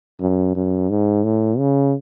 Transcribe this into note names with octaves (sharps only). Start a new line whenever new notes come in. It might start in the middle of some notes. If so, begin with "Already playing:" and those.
F#2
F#2
G#2
A2
C#3